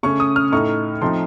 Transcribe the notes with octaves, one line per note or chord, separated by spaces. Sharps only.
C#3 A3 C#4 C#6
D#6
F6
A2 A3 D#4 C#6
F3 A3 C4 D#4 C6